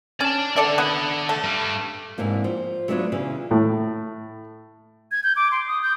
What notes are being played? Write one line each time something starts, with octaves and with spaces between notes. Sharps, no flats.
C#4 D5 A5
D4 A4 D5 E5 F#5
B3 E4
A3
G2 G3
G#2 C3 E3 A#3 D4
F3
F#3 A3 B3 D4 F4 C#5
A#2 C#3 E3
A2
G#6
G6
D6
C6
D#6
G6